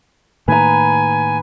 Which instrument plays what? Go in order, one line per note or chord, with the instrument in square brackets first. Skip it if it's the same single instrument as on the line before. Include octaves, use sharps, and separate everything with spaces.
[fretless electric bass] A2 D#3 A#3 [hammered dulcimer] B4 A#5 [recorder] G#5